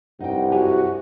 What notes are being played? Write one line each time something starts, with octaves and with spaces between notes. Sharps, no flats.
C2 G2 D#4 F#5 G5
F#4 G4 C#5 G#5